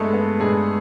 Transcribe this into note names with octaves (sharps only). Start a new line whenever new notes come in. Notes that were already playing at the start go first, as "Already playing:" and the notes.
Already playing: G2 G#3 A3 B3 A4
B3
G2 G#3 G#4